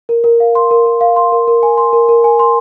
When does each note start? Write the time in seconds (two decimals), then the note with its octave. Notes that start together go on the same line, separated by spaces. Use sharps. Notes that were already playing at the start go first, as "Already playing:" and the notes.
0.09 A#4
0.24 A#4
0.40 F5
0.55 C6
0.71 A#4
0.86 A#4
1.01 F5
1.16 C6
1.32 A#4
1.48 A#4
1.63 G#5
1.78 C6
1.93 A#4
2.09 A#4
2.24 G#5
2.39 C6